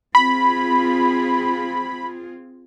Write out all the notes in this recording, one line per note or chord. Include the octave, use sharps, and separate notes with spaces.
C4 F4 G#4 B5